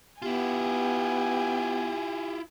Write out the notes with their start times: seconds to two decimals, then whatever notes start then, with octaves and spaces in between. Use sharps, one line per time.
0.22 B3 E4 F4 G4 G#5